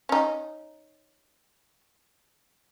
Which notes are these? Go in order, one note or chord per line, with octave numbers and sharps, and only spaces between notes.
C#4 D#4